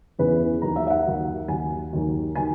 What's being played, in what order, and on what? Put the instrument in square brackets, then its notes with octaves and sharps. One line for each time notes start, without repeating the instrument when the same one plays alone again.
[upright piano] E2 C#3 E3 B4
D#2 D#3 F#3 A#5
E5
E5
F#5
D#2 D#3 F#3
D#2 D#3 F#3 G#5
D#2 D#3 F#3
D#3 F#3 G#5